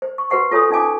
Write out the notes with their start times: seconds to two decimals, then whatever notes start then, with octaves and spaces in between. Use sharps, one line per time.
0.02 C5
0.18 C#6
0.30 F#4 B4 C5 F#5 C#6
0.51 F4 A4 C#5 G#5 B5 D#6
0.70 C#4 D#4 F5 G#5 D6